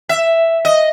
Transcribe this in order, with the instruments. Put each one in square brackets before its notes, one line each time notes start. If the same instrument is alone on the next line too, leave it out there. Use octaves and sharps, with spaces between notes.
[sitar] E5
D#5